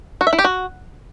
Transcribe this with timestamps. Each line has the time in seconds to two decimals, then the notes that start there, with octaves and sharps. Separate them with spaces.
0.21 F#4
0.27 E5
0.33 E4
0.39 G4
0.44 F#4